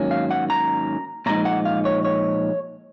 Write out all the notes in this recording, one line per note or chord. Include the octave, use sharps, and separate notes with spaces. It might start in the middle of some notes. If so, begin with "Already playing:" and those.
Already playing: G#2 D#3 F#3 A#3 C#4
F5
F#5
A#5
A#2 F3 G#3 D#4 A#5
F#5
F5
C#5
C#5